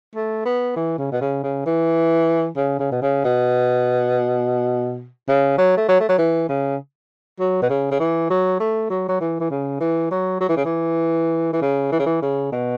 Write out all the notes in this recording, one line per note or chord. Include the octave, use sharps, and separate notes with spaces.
A3
B3
E3
C#3
B2
C#3
C#3
E3
C#3
C#3
B2
C#3
B2
C#3
F#3
A3
F#3
A3
F#3
E3
C#3
F#3
B2
C#3
C#3
E3
F#3
A3
F#3
F#3
E3
E3
C#3
E3
F#3
F#3
E3
C#3
E3
E3
C#3
E3
C#3
E3
C#3
B2